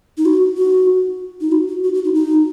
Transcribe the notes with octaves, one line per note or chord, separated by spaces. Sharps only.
D#4
F#4
F#4
D#4
F#4
F#4
F#4
F#4
D#4
D#4